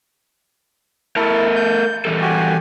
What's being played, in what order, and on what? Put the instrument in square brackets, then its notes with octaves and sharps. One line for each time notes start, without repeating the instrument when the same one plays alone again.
[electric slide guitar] A3 A#4 A5 [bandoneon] E4
[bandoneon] G6
[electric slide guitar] E3 G3 A4
[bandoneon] F#4 G4 G#5